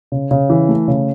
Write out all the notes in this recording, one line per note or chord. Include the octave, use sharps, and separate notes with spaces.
C#3
C#3
E3
A3
C#3